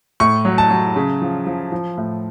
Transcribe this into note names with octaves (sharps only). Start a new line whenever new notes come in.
A2 C#6
F#3
A5
F#3
C#3
F3
F3
F3
A2